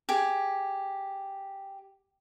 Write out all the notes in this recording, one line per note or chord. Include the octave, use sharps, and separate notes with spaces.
G4 G#4